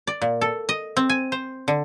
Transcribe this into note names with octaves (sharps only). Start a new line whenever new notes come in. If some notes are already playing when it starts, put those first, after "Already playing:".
D5
A#2
A4
D#5
C4
G#5
C5
D3